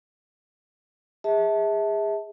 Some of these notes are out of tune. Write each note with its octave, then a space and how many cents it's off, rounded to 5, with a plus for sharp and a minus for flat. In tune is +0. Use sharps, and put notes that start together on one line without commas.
G#4 -25 E5 -30 A5 +0